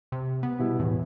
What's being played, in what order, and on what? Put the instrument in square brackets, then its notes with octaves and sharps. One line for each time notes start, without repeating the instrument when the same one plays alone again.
[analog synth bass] C3
B3
[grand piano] B2 G3 E4
[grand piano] E2 [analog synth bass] A2